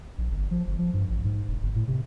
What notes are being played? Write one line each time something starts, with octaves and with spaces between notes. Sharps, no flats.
A#1
G1
F3
G1
F3
G2
A1
G#2
E1
G1
A2
C3